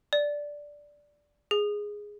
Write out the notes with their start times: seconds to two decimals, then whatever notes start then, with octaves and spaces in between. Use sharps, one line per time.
0.13 D5
1.51 G#4